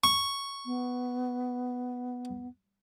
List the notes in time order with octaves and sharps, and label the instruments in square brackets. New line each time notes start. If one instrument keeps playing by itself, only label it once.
[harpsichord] C#6
[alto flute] B3